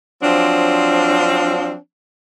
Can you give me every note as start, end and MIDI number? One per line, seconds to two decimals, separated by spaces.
0.22 1.76 53
0.22 1.76 54
0.22 1.76 60
0.22 1.76 62